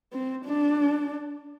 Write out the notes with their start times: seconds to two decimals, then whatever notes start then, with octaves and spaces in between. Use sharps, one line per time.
0.13 C4
0.45 D4